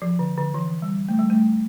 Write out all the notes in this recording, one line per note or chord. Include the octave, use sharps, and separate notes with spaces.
F3
D3
D3
E3
G3
A3
G3
A3